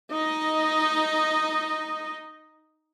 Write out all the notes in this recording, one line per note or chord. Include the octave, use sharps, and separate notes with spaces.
D#4 D#5